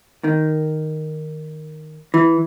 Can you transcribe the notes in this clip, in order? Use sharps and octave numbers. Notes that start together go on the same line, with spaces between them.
D#3
E3